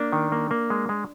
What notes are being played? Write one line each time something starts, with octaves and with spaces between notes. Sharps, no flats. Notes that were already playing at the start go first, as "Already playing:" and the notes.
Already playing: A#3 D4
D#3
A#3
A#3
G#3
G#3